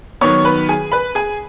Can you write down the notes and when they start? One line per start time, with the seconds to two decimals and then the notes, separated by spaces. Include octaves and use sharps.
0.21 D#3 F#3 B3 C#5 C#6
0.45 B4 B5
0.69 G#4 G#5
0.92 B4 B5
1.15 G#4 G#5